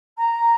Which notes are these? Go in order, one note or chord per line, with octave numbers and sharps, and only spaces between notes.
A#5